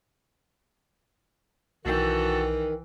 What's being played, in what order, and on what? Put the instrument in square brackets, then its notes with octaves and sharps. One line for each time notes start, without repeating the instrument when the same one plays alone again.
[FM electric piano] B1 G5 [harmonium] D#3 [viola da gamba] E3 [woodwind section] F#4 A4